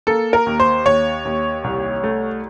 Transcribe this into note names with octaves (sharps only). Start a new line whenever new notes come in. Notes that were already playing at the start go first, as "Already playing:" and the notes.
A#3 A4
A#4
D#2
C5
D#2 C#5
D#2
C2
A3